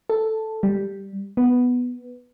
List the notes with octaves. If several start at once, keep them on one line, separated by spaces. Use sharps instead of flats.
A4
G3
B3